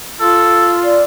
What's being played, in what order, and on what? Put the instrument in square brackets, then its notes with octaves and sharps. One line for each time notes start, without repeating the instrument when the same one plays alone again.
[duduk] F4 [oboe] A4
[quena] D5